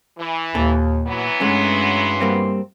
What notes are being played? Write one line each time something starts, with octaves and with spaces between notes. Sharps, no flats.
E3
D#2 A#2 A4
E3 F#3 B3
G2 G#3 A3 C#4 C6
G3 A#3 C4